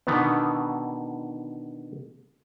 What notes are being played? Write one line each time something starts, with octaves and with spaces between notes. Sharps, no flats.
B2 D3 D#3 B3